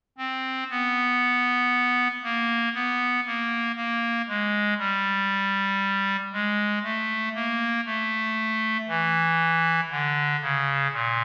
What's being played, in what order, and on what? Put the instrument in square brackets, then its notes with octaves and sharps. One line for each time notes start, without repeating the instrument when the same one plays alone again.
[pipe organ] C4
B3
A#3
B3
A#3
A#3
G#3
G3
G#3
A3
A#3
A3
E3
D3
C#3
A#2